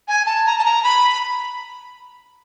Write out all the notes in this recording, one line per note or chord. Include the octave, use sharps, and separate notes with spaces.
G#5
A5
A#5
A5
A#5
B5